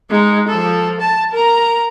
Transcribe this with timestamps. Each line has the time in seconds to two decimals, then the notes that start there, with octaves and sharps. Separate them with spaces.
0.10 G#3 D#4
0.48 F3 A4
1.00 A5
1.32 A#4 A#5